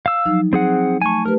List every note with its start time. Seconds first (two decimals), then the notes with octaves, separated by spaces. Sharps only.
0.06 F5 E6
0.26 F3 F#3 D#4
0.53 C4 G#4 F#5
1.02 A3 G#5 A5 C#6
1.26 A3 G4 A#4 B4